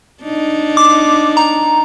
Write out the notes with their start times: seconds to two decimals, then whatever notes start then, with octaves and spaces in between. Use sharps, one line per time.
0.23 D4 D#4
0.77 D6
1.37 A#5